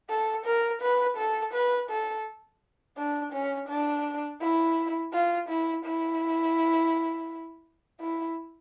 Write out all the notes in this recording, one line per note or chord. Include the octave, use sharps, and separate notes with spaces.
A4
A#4
B4
A4
B4
A4
D4
C#4
D4
E4
F4
E4
E4
E4